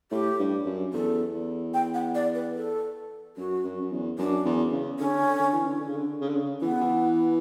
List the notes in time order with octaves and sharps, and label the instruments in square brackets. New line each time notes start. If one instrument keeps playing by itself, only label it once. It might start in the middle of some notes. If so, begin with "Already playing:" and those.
[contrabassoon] A2 [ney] G4
[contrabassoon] G2
F#2
[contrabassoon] E2 [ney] A4
[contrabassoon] E2
[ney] G5
F#5
D5
B4
A4
[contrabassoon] F#2 [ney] F#4
[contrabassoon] F#2
F#2
E2
[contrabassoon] F#2 [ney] D4
[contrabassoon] E2
C#3
[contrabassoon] D3 [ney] C#4
[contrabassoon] D3
E3
D3
D3
C#3
D3
C#3
D3
C#3
[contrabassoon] E3 [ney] B3
[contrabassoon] E3